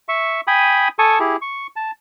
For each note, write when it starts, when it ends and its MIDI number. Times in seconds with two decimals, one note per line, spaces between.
0.09 0.41 76
0.09 0.41 85
0.47 0.88 79
0.47 0.88 80
0.47 0.88 83
0.47 0.88 87
0.99 1.19 69
0.99 1.19 80
0.99 1.19 81
0.99 1.19 85
0.99 1.19 87
1.20 1.36 64
1.20 1.36 67
1.20 1.36 68
1.42 1.67 85
1.76 1.91 81